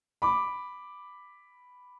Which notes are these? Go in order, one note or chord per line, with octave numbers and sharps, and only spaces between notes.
B5 D6